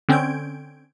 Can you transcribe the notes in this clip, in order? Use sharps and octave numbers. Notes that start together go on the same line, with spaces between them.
D3 C4 C#4 G6 G#6 D7